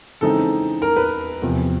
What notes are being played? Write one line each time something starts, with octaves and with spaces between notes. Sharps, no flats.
C#3 E3 G#3 C4 D#4 A4
A#4
B4
E2 C3 F3